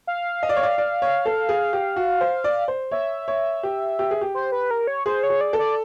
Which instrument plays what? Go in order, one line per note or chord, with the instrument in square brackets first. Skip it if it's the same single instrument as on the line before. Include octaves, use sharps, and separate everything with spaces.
[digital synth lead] F5
[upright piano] D#5
D5
C#5
D5
D5
C#5
A4
G#4
G4
F#4
C5
D5
C5
[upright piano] C#5 [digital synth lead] E5
[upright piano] C#5
G4
G4
G#4
G4
[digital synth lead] C5
B4
A#4
C#5
[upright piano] G#4 [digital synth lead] C5
[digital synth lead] C#5
[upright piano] G#4
[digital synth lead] D5
[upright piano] A4
[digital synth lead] D5